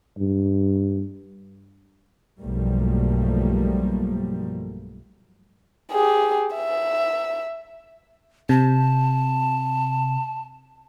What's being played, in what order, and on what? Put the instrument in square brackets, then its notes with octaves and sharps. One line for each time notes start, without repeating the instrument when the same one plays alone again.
[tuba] G2
[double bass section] B1 G2 F3 G3 A3 A#3
[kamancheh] G4 G#4
E5
[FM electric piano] C3 [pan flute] A5